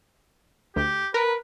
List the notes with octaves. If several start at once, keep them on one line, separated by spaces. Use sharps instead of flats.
D2 G4
A#4 B4